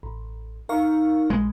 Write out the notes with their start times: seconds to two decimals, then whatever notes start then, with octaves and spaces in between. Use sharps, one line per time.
0.03 A1
0.69 D#4 A#4 F5 C#6
1.30 A#1 G#3